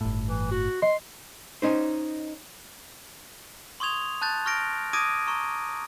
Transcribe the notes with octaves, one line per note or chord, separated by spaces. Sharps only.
G1 A2
E3
F#4
D#5 C6
C#4 D#4 C5
C6 C#6 D#6 G#6 F7
A5 F#6 G6 A6
C#6 F6 G6 A#6 D7
D6 D#6 G#6 A#6 D7 D#7
A#5 C#6